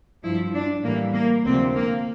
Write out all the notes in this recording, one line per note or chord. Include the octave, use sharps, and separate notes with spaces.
G2 F3 E4
D4
A2 E3 G3 A#3
A#3
D2 C3 F3 C4
A#3